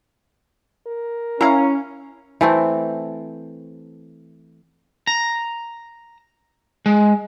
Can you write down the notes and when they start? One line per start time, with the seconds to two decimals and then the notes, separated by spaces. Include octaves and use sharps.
0.87 A#4
1.41 C#4 E4 F5 A#5
2.41 E3 A3 C4
5.07 A#5
6.86 G#3